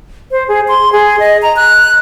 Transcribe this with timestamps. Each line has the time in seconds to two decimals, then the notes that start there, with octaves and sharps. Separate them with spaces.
0.31 C5
0.48 G#4
0.68 C6
0.93 G#4
1.19 D#5
1.42 A#5
1.56 F#6